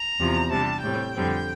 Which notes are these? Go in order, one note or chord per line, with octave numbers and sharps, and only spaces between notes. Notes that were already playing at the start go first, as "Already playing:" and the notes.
Already playing: A#5
E2 C3 F3
C3 G3 D4 A5
A2 G3 C4 G5
F2 D3 G3 C4